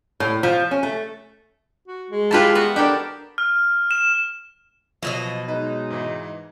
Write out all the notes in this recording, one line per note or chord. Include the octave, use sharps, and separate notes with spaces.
A2
F3
C#4
A3
F#4
G#3
E4 F4 G4 B4 A5
B3 F#4
D4 G4 A4 A#4
F6
E7
B2 F3 F#3 B3 D#5
G#3 D#4 B4
G#2 E3